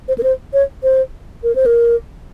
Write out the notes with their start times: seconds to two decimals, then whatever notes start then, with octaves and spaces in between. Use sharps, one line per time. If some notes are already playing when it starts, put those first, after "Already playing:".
0.08 C5
0.18 A#4
0.23 C5
0.53 C#5
0.83 C5
1.43 A#4
1.55 C5
1.66 A#4